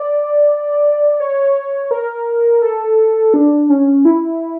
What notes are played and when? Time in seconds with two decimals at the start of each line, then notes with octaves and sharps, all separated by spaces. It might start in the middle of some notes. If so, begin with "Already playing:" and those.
Already playing: D5
1.20 C#5
1.91 A#4
2.62 A4
3.34 D4
3.70 C#4
4.05 E4